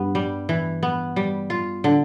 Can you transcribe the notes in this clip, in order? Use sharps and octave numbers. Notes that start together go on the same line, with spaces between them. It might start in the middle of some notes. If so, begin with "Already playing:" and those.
Already playing: G2 B3
G3
E3
B3
G3
F4
D3